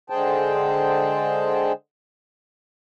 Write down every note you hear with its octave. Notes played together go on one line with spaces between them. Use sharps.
D3 G#3 G#4 C5 G5 A5